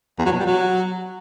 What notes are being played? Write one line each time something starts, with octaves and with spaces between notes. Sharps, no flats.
E2
F#3
B2
G3
F#3